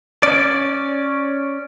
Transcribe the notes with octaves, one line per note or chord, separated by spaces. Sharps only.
C#4 D5